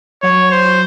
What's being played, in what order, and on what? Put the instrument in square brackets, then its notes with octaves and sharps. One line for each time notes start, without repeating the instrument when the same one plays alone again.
[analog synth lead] F#3 [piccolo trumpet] C#5
[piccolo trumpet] C5